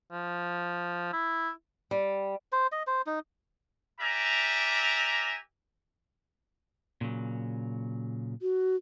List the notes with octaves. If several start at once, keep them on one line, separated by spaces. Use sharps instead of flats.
F3
E4
G3
C5
D#5
C5
D#4
G4 A#4 D5 E5 G#5 A#5
A#2 C#3 F#3
F#4